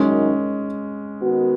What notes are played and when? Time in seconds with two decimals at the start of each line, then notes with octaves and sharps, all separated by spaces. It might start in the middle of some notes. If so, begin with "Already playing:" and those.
Already playing: F#2 D#3 F#3 G#3 C#4 D#4
1.19 D#3 B3 F#4